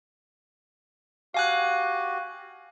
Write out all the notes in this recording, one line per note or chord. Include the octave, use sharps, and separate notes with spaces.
F#4 G4 F5 G#5 F#6